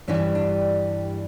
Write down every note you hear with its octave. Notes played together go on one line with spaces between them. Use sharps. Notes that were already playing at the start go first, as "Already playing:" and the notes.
G2 E3 G3 C#4
D4